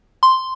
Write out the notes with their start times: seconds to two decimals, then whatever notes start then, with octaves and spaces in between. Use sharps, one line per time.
0.23 C6